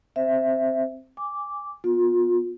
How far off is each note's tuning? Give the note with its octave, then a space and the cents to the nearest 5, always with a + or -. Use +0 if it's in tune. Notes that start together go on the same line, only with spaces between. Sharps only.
C4 +0 C5 +0 E5 +5
G#5 -20 D6 -5
B3 -10 F4 +30